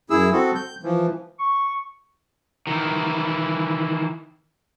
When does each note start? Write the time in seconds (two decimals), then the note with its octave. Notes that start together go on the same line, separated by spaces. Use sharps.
0.10 F#2 E4 G#4 E6
0.32 C4 F#4 A4
0.55 G6
0.83 E3 F3
1.39 C#6
2.67 D#3 E3